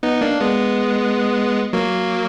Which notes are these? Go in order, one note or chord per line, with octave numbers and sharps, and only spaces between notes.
B3 D#4
A#3 D4
G#3 B3
F#3 A#3